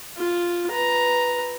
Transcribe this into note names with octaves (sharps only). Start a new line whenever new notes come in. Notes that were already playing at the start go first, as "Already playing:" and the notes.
F4
B4 A#5